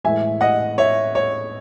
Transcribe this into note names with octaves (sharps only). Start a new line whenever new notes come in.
A2 E3 G#3 E5 G#5
D#5 F#5
C#5 E5
C#5